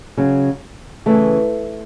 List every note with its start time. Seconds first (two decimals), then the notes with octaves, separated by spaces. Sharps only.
0.17 C#3 F#3
1.06 C#3 E3 A3